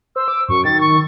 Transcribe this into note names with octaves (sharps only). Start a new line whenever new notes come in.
C5 E6
D6
F#2 C#6
D#3 A6
C#6